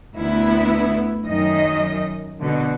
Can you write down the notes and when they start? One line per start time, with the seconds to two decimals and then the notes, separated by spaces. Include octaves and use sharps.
0.15 D2 B3 E4
1.25 F#2 D#3 D#5
2.40 B2 D3